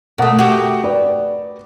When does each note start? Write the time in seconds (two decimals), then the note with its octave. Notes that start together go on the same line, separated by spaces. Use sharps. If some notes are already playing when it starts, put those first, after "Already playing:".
0.18 B2 A3 A#4 F#5 D#6
0.39 F#4 G4
0.84 B4 D5